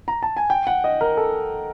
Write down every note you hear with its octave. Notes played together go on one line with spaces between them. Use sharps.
A#5
A5
G#5
G5
F#5
D#5
A#4
A4